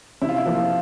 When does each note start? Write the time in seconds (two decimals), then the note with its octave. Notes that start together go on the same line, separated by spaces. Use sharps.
0.22 C3 E4
0.29 F4
0.36 E4
0.46 F3 A#3